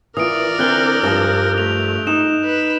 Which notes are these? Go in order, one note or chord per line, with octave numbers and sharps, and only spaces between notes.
E3 F4 A#4 D5 D#6 D7
D3 E3 C4 F#6 G6 G7
G2 F3 A5
A3 F7
D#4 E7
B4